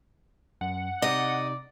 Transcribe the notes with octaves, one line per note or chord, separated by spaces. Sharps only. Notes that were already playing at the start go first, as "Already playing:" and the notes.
F#2 F#5
C3 D#4 D5 D#5